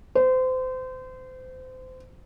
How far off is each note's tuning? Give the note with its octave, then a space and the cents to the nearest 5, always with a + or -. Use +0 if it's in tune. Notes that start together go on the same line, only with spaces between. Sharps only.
C5 -30